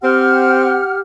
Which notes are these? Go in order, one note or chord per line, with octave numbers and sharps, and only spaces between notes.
C4 G4 F#5 F6